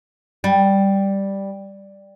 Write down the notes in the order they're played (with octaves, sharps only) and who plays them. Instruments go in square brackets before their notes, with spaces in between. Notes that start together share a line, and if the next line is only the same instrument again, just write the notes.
[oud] G3